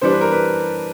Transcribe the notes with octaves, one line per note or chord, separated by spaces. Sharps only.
E3 G3 B3 D4 C5
B4
A#4
B4